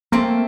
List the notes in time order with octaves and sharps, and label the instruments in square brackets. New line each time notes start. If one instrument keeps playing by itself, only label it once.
[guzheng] A3 C4 [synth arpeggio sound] A#3